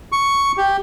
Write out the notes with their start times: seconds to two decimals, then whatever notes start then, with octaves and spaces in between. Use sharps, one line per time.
0.12 C#6
0.57 G4